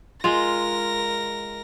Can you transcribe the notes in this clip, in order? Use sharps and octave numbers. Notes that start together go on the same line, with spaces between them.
G#3 F4 A#4 A#6